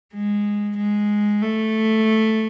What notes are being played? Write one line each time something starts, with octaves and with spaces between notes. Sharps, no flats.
G#3
G#3
A3